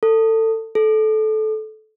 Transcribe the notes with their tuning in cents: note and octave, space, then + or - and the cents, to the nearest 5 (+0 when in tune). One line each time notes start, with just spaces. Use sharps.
A4 +25
A4 -20